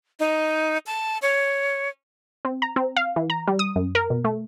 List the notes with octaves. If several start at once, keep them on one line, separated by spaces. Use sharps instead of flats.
D#4
A5
C#5
C4
A#5
C4
F5
E3
A#5
G3
D#6
F#2
A#4
B2
A3